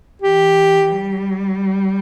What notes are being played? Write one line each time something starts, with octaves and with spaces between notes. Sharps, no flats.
E3 G4
G3